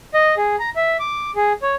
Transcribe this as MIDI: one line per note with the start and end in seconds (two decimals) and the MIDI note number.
0.14 0.35 75
0.37 0.56 68
0.60 0.70 82
0.76 0.97 76
0.99 1.31 86
1.36 1.53 68
1.62 1.75 73